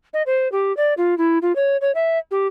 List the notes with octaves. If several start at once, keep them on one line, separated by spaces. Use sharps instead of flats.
D#5
C5
G4
D5
F4
E4
F4
C#5
C#5
E5
G4